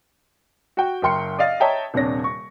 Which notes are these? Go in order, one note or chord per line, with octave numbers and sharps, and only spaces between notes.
F#4 G5
F#1 A#4 G5 C6 C#7
D5 D#5 F5 A6
C#5 D#5 E5 G5 A5 A#5
D#1 C3 D4 C#5 A#6
C#6